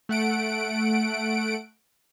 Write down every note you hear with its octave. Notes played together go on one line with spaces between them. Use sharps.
A3 F#5 D7